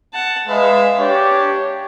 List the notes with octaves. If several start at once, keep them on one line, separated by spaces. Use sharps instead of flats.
F#5 A5
G#3 B4 E5 F5
D4 G4 C#5